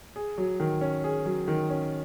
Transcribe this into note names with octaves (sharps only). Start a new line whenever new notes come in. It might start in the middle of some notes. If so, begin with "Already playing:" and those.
G#4
F#3
D#3
C#4
G#4
F#3
D#3
C#4